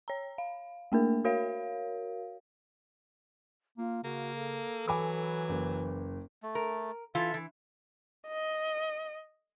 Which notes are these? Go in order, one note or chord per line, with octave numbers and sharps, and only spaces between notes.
C#5 A#5
F5
A3 A#3 D4 A#4
F#4 A#4 C#5 F5
A#3 F4
C#3 A#3 F#4
A4
E3 F#3 G#5 B5 D6
F#1
A3
A#4
E3 F4 A4 E5
E3
D#5